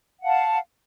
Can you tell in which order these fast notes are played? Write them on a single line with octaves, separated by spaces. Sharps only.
F#5 F5 A5